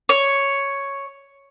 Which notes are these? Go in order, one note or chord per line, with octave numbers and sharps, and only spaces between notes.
C#5